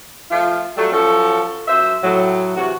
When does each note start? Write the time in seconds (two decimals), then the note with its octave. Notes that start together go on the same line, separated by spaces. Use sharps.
0.31 F3 A3 F4
0.77 F#3 G3 A3
0.92 F3 F#3 C#4 A4
1.68 F#2 C5 E5
2.03 A2 F#3
2.56 C3 E3 F#4